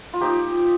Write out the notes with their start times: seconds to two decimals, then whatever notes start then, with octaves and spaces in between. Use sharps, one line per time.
0.14 F4
0.21 F3 A#3 D#4 G4